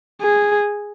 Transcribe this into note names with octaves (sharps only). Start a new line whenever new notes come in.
G#4